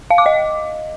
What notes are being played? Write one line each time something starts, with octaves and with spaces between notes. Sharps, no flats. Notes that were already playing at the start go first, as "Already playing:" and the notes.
F5
D6
D#5